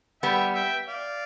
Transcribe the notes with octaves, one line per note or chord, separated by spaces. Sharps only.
G3 B3 E5 G5
E5 G5
D5 F5